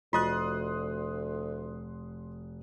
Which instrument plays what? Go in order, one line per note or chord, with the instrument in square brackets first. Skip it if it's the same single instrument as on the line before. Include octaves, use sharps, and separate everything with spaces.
[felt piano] F1 F#4 [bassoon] D2 [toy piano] F4 D#5 [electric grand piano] C6 D#6 F#6